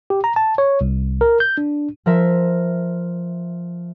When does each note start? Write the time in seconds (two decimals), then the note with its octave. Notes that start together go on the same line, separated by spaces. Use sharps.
0.10 G4
0.24 A#5
0.36 A5
0.58 C#5
0.81 C2
1.21 A#4
1.40 G6
1.58 D4
2.06 F3 A#4 E5